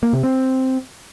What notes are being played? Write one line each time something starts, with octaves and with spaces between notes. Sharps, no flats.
A#3
C3
C4